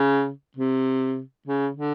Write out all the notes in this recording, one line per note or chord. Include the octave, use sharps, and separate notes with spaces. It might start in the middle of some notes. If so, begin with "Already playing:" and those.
Already playing: C#3
C3
C#3
D3